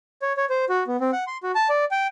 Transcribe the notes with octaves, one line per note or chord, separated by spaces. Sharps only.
C#5
C#5
C5
F#4
B3
C4
F#5
C6
F#4
A5
D5
G5